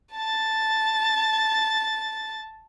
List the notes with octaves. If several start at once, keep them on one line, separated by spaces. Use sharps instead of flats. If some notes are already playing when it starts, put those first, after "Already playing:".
A5 A6